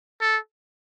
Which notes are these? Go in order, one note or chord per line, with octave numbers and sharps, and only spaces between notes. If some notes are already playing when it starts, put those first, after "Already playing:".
A4